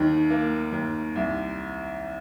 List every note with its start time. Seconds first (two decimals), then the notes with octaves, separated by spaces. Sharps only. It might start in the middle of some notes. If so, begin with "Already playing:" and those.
Already playing: D#2 D#3
0.30 A#3
0.72 D#2
1.16 C2